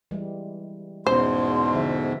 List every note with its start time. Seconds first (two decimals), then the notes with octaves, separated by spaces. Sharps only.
0.11 E3 G3 G#3
1.07 E2 G#2 B2 G#3 C4 C#4 C5 C6
1.74 D3 F3 E5